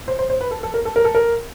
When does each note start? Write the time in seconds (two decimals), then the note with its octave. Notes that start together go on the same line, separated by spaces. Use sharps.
0.08 C5
0.19 C5
0.30 C5
0.41 B4
0.51 A4
0.63 A4
0.74 A#4
0.85 A4
0.96 A#4
1.05 A4
1.15 A#4